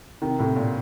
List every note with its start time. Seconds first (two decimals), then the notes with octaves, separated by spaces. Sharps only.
0.22 C3 D#3
0.39 A2 C3
0.56 A#2